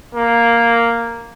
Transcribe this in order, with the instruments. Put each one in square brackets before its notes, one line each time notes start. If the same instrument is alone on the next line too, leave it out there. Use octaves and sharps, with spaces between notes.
[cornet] A#3